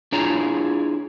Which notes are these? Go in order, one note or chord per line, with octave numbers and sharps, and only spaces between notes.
D4 E4 F4 G#4 C#5 A#5